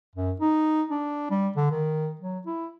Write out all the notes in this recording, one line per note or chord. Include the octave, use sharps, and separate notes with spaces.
F#2
D#4
D4
G3
D3
D#3
F#3
E4